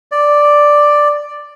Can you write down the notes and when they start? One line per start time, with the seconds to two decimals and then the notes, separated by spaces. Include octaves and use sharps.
0.12 D5